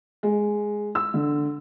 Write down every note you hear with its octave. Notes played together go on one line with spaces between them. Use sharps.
G#3
E6
D3